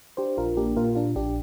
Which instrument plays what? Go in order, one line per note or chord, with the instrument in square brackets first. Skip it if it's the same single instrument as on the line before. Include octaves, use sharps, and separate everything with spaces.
[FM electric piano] D4 G4 C5
A#1 F4 A#4
A#3 D4 G4
A#2 F4 A#4
D4 F4
A#1 D4 G4